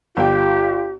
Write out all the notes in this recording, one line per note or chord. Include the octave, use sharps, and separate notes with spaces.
G1 F4 G4 G5